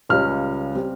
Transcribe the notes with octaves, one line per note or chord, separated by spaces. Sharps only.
C#2 C#3 G3 C#4 F6
G3 C4